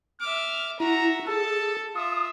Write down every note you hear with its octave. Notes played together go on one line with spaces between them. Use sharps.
E5 D6 F6
E4 F#4 E5 A#5
G#4 A4 A5
F4 E5 D#6